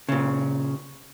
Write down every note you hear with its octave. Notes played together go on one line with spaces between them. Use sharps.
A#2 C#3